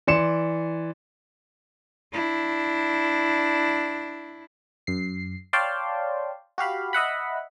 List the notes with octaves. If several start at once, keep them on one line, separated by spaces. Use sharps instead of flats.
E3 D5 C6 C#7 E7
D4 E4
F#2 C7
C#5 D5 F5 G5 A5 C6
F#4 G4 F5 B5
D#5 E5 F#5 B5